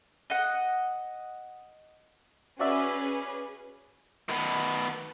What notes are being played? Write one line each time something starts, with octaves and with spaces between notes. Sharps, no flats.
D#5 F#5
C#4 F#4 G#4 B4 D5 E5
D#3 B3